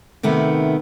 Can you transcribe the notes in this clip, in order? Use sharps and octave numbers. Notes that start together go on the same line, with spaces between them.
C3 D#3 A3 B3